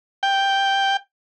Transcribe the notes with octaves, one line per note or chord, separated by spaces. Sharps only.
G5